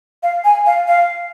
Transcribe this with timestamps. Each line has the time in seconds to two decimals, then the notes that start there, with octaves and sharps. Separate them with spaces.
0.23 F5
0.45 G#5
0.66 F5
0.88 F5